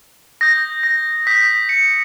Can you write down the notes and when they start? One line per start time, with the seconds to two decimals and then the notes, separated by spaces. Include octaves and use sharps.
0.41 D#6 G6 A#6
0.83 A#6
1.27 D#6 G6 B6
1.69 C#7